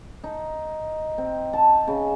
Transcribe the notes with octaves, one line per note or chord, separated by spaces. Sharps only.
D#4
C4
A5
C#3